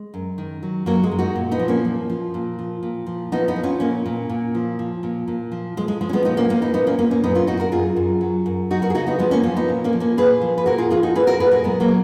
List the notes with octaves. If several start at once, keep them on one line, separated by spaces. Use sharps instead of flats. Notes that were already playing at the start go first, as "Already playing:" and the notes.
Already playing: G#3
F#2
D#3
F#3
F#2 F#3 A#3
G#3
F#2
D#4 F#4
A#2
B3 D#4
F3
A#3 C#4
F3
F3
A#2
F3
A#2
F3
F3 B3 D#4
B3 D#4
F3
C#4 F4
A#2 A#3 C#4
A#2
A#2
F3
F3
A#2
A#2
F3
F3 G#3
G#3
F3 G#3
C#4
G#3 B3
A#2 B3 D#4
A#3 C#4
A#2 A#3 C#4
B3 D#4
A#2 B3 D#4
A#3 C#4
A#2 A#3 C#4
A#3 C#4
F#2 B3 D#4
C#4 F4
F#2 D#4 F#4
F#4 A#4
F#2 F4 G#4
F#2
F#3
F#2
F#3 D#4 F#4
F#4 A#4
G#4
C#3 D#4 F#4
B3 D#4
F3 G#3 B3
A#3 C#4
F3 C#4 F4
B3 D#4
A#2
A#3 C#4
F3
A#3 C#4
A#2 G#4 B4
F3
B4
A#2 F#4 A#4
F4 G#4
F3 F4 G#4
D#4 F#4
A#2 G#4 B4
F#4 A#4
A#2 G#4 B4
F#4 A#4
F#3 G#3 B3
F#3 A#3
A#2